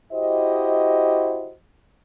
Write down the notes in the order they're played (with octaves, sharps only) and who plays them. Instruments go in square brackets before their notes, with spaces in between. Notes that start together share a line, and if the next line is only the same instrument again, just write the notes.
[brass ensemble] E4 F#4 G4 C5 D#5